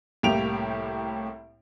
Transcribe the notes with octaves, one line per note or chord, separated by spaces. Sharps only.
C2 A2 A#3 G4 D7 F7